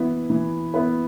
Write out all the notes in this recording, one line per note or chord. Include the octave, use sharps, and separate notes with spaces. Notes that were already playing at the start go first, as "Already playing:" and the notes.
Already playing: E3 B3 E4 B4
E3
B3 E4 B4